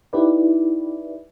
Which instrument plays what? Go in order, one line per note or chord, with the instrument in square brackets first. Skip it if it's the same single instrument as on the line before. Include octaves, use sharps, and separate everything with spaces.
[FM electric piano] D#4 E4 G4 B4 D5